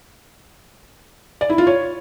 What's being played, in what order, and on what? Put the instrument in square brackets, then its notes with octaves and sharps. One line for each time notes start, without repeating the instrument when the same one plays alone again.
[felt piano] D5
E4
F4
C#5